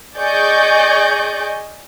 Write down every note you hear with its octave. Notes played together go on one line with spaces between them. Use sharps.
G#4 D5 D#5 G#5 C#6 G6